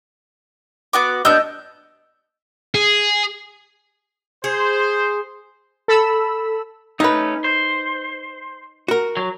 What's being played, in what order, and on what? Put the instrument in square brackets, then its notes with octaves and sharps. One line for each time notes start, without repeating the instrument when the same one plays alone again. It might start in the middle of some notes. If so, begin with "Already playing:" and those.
[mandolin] B3 F#4 D6
[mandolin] B3 D4 G6 [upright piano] D#5 E6
[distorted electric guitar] G#4
[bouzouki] G#4 [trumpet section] C5
[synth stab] A4 B5 E6
[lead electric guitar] A3 C#4 [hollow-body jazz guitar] D#4 B4
[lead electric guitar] C5
[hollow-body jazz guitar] F#4 A#4
[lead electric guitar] F#3